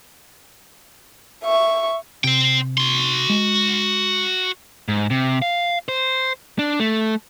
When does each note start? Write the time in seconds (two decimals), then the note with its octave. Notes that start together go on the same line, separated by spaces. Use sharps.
1.44 E5 C#6
2.24 C3 C5 G5
2.78 F#4 C6
3.30 G#3
4.88 G#2
5.10 C3
5.42 F5
5.88 C5
6.59 D4
6.80 A3